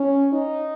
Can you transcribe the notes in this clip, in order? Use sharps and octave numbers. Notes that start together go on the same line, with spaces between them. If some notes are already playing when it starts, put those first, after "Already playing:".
Already playing: C#4
D#4